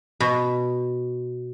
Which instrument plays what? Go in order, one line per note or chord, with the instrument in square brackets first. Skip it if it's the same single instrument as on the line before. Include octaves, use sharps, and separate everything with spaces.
[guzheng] B2